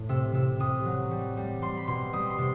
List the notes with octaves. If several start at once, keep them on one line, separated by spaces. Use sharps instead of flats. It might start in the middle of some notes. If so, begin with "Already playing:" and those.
Already playing: A2
C3 E6
C3 E6
C3 D#6
F#3
G3
G3
G3 C6
B5
B2 C6
G3 D#6
C6
C3